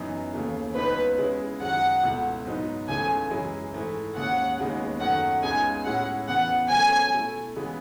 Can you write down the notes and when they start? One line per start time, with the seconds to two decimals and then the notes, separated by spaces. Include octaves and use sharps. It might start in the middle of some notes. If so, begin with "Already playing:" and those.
Already playing: F#2 E3 B3 D#4
0.33 D#2 C#3 E3 A3
0.76 C#2 C#3 E3 B3 D#4 B4
1.18 C#3 G#3 C#4 E4
1.60 F#2 D#3 G#3 F#5
2.03 C#2 B2 A3 E4
2.45 G#2 F#3 B3 D#4
2.88 C#2 C#3 E3 A3 G#5
3.30 F#2 E3 G#3 C#4 E4
3.73 G#2 E3 A3 E4
4.15 D#2 C#3 G#3 F#5
4.58 D#2 C#3 G#3 B3 D#4
5.00 F#2 D#3 A3 F#5
5.43 C#2 C#3 G#3 B3 D#4 G#5
5.85 A2 G#3 C#4 E4 F#5
6.28 E2 C#3 E3 B3 F#5
6.70 C#3 F#3 A3 C#4 G#5
7.13 B2 A3 E4
7.56 C#3 E3 G#3 B3 E4